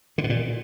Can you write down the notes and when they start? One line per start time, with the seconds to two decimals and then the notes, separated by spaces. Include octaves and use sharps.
0.18 D3
0.24 B2
0.29 A#2